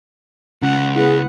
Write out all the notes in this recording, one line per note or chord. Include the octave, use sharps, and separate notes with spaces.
C#2 C#4 F#5
B3 E4 G#4 F#5